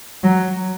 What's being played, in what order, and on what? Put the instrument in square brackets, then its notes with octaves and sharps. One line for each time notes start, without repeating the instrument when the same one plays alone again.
[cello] F#3